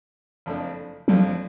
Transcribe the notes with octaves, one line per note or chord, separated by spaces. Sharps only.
F#1 F2 F3 A3 D4
F#1 F2 F3 F#3 A3 D4